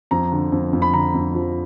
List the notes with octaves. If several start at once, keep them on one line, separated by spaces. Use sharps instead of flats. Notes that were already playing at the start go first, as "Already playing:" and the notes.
F2 A#5
D3
F2
F2
B5
D3 A#5
F2
F3